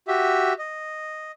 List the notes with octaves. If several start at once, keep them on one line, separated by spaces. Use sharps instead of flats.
F#4 G4 E5
D#5